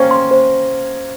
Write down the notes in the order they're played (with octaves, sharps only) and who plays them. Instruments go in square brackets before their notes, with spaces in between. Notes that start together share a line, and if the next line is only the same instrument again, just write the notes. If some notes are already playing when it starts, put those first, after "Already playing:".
Already playing: [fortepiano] A#3 C#4 [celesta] C5 G5
[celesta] C6
C5